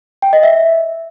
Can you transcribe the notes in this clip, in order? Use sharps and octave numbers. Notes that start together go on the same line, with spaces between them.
G5
D#5
E5